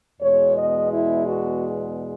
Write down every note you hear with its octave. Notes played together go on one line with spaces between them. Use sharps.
E2 B2 G#3 C#5
D#5
E4
F#4